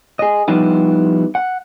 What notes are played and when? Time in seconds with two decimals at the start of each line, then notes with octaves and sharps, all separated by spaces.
0.19 G#4 D#5
0.48 F3 G3 B3 D#4 E4 G4
1.35 F#5